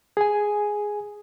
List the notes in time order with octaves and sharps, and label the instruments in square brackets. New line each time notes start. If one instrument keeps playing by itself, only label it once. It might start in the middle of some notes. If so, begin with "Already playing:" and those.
[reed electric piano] G#4 G#5